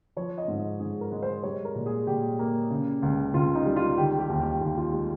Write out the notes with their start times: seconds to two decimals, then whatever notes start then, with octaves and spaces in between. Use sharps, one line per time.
0.16 F3 C#5
0.38 D#5
0.48 G#2
0.59 D#5
0.80 G#2 G#4
1.01 A#4
1.12 G#3
1.23 C5
1.43 G3 C#5
1.65 A#4
1.75 A#2
1.86 G#4
2.07 A#2 G4
2.39 A#3
2.71 C#3
3.02 C#2
3.34 C#2 F4
3.55 D#4
3.66 G3
3.76 F4
3.98 D#3 G4
4.19 G4
4.29 D#2
4.40 G4
4.61 D#2
4.77 F4
4.93 G#3 G4